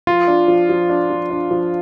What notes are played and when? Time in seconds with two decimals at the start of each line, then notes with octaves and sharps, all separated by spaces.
0.07 F3 F4
0.27 D4
0.48 F3
0.69 F3
0.89 D4
1.10 F3
1.31 D4
1.51 F3